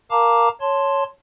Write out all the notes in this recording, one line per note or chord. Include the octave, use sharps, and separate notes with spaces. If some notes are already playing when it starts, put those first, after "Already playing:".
A#4 F5 A5 A#5 D6
C#5 A5 C6